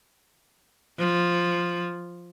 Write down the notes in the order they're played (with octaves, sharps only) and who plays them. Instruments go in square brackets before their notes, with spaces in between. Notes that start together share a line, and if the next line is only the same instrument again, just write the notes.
[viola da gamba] F3